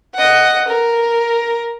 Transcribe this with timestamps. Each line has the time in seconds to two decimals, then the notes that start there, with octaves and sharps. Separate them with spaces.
0.14 D#5 F#5
0.68 A#4